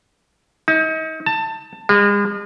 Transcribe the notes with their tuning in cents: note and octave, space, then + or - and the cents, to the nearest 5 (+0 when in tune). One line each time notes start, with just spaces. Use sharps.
D#4 +35
A5 +20
G#3 -40